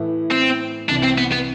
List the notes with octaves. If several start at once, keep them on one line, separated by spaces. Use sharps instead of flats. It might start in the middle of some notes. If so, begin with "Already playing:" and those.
Already playing: A2 E3 A3 E4 B4
C4
C2 C3 E3 D4
C4
B3
B3